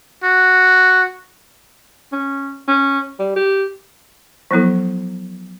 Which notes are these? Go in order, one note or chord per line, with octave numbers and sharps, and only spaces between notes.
F#4
C#4
C#4
G3
G4
F3 F#3 B3 E4 A4